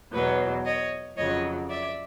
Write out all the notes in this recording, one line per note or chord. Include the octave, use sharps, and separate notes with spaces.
E2 B2 F#3 B4 C#5
C#5 D#5
F2 C#3 F#3 C#5 D#5
D5 E5